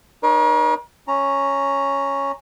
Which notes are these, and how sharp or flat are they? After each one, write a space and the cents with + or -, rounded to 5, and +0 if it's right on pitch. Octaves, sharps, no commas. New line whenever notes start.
D#4 -35 A#4 +45 C#5 +0
C#4 +0 A#5 +0